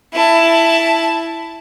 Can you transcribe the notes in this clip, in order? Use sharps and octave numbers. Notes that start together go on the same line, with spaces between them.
E4 A5